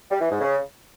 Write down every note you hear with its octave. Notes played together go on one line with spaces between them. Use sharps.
G3
E3
G#2
C#3